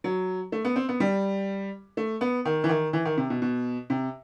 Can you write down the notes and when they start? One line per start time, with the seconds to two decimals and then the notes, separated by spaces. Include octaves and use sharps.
0.04 F#3
0.52 A3
0.65 B3
0.76 C4
0.89 B3
1.00 G3
1.97 A3
2.21 B3
2.45 D#3
2.64 E3
2.69 D#3
2.93 E3
3.05 D#3
3.17 C3
3.30 B2
3.42 B2
3.90 C3